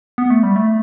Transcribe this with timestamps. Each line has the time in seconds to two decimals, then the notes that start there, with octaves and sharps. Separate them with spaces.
0.18 B3
0.30 A3
0.43 G3
0.56 A3